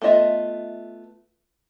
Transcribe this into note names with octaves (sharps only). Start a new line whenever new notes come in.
A3 B3 F4 D#5 E5